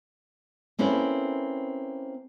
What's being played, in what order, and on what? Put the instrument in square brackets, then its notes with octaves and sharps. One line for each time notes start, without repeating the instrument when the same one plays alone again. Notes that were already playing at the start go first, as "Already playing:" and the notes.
[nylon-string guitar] A#3 C4 C#4 E4 A4 B4